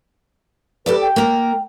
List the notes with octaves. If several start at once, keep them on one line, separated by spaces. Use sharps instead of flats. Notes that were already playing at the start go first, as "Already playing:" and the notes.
G4 A4 B4 D5
G5
A#3 A#4